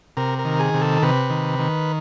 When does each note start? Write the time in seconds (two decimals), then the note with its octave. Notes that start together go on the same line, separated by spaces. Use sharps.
0.17 C3 A#4
0.39 A#4
0.45 D#3
0.59 G#4
0.74 C3
0.81 A4
1.02 C3 B4
1.30 D#3
1.59 D#3